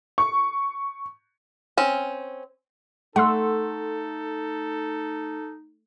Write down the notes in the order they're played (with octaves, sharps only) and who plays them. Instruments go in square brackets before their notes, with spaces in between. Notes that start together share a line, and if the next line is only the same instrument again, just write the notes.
[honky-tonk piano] C#6
[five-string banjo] C4 C#4
[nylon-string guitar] A3 [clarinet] D#4 [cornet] A4 [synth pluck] F#5 C6 E6